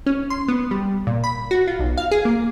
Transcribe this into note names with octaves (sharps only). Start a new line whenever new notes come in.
C#4
C6
B3
G3
A#2
B5
F#4
F4
B1
F5
G#4
A#3